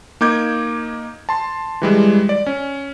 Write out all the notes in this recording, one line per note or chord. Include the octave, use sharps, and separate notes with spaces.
A#3 D#4 D6 G6 G#6
A5 C6
E3 G3 G#3
D5
C#4